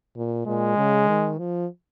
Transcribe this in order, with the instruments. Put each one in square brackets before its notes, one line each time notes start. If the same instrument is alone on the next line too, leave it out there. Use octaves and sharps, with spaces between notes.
[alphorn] A#2
[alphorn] A#2 [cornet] G#3
[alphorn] C#3
D#3
F3